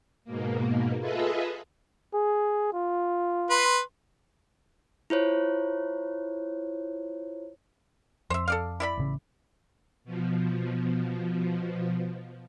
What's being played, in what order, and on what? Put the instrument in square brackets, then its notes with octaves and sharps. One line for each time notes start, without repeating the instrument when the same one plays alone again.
[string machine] G#2 B2 A#3
F4 G#4 A4 B4 D#5 E5
[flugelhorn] G#4
F4
[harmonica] B4 C6
[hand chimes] E4 F4 C5 C#5
[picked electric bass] F2 [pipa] C5 E5
[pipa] A4 D5 F5
E4 D5 B5
[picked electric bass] A1 C#3 C#4
[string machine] B2 F3